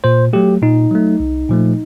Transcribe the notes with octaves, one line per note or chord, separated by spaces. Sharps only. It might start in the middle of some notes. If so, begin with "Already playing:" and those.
A#2 C5
F#3 A3 G4
A#2 D#4
F#3 A3
C2
A#2 F3 A3